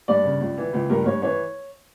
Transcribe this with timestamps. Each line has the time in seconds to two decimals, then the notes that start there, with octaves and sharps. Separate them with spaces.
0.08 G2 D5
0.24 C#3
0.40 C#2
0.58 E3
0.73 C#2
0.90 G2 A#4
1.06 G2 C#5
1.22 E3 C#5